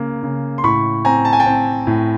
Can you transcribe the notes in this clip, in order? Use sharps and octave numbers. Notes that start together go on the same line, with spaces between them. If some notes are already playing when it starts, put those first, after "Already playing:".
Already playing: C#3 A#3
C#3
C6
A2 B5 C#6
C4 G#5 A#5
A5
G#5
G5 A5
C4
A2